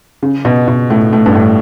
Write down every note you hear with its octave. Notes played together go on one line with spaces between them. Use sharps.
C#3
B2
B2
A2
A2
G2
A2